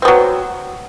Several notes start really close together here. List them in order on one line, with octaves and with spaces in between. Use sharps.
C4 B3 F#3